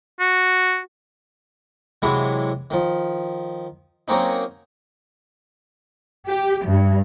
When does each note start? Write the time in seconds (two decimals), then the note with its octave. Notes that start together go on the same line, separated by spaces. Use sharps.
0.20 F#4
2.02 C3 E3 F#3 G#3 E4
2.70 D#3 F3
4.08 F#3 A#3 C4 C#4 D#4
6.27 G4
6.66 G2